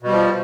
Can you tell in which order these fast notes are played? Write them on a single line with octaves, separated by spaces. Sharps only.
B2 G3 F3